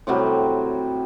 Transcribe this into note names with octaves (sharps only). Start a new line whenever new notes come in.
A2 C3 F#3 G3